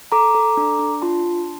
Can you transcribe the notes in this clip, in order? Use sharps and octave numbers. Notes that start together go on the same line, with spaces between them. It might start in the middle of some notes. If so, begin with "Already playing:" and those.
A4 A#5 D6
A4
D4
D4
F4 A5 C6
D4